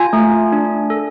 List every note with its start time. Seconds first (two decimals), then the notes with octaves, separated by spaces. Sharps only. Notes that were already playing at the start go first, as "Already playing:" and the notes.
Already playing: F4 G#5
0.13 A3
0.52 D4
0.90 A4